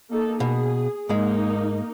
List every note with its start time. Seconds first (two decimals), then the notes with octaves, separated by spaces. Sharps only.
0.10 A#3 D#4 A4
0.40 B2 G#4
1.09 G#2 G#3 A#3 D#4